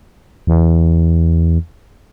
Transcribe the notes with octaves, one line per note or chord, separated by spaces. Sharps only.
E2